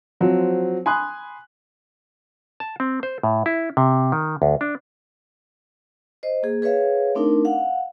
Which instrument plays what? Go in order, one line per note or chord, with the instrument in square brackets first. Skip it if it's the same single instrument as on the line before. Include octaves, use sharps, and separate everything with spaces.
[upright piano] F3 F#3 C4 C5
G#5 B5 C6 D#6 F#6
[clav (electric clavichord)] A5
C4
C5
A2
E4
C3
D#3
D2
D4
[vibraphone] C5 D#5
A#3 G#4
G#4 B4 C#5 E5 F5
A3 C4 D4 D#4 A#4
F5 F#5